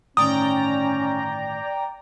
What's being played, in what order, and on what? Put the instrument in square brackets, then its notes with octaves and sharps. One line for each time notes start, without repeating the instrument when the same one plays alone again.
[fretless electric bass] G1 A2 D#3 [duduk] C#4 [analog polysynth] D5 G5 A#5 [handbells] D#6